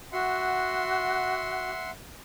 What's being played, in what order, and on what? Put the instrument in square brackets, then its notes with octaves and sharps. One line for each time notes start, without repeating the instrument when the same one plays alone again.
[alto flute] F#4 [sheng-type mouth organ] E5 F#5 C6